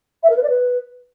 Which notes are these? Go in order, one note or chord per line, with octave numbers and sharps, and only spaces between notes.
E5
A#4
B4
D5
B4